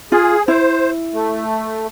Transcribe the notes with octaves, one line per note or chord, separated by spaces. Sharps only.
F4 G#4
E4 C5
A3